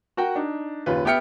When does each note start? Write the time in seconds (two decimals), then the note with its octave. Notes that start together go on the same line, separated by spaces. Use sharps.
0.17 F#4 A#4 F#5 G5
0.36 D4 D#4
0.86 F#1 D#2 C#4 F4 B4
1.05 B3 G4 E5 G5 F6 C#7